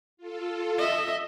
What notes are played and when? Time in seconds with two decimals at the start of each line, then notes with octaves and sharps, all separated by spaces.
0.17 F4 A4
0.78 D#5 E5